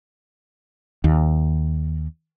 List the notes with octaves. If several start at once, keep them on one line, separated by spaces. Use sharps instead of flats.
D#2